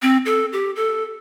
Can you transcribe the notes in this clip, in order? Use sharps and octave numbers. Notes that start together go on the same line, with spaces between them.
C4
A4
G4
A4